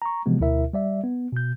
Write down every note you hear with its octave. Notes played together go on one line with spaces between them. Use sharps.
A#5 C#6
C3 E3 F3 G#3 B3
D2 B2 E4 A#4 E5
G3 D5 E5
B3
B2 G6